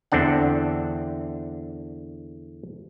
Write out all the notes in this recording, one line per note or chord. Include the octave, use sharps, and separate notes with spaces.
E2 D3 C4 D4 F#5